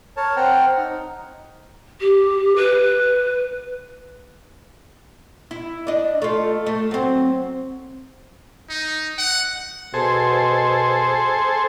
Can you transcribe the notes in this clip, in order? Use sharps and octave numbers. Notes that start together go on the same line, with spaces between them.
A#4 C#5 A5
C4 C5 F#5 G5 A#5 F6
D#4
G4
B4
E4
D4 D#5
A3 F4
A3
F#3 C4
D#4
F#5
B2 G#4 A4 C5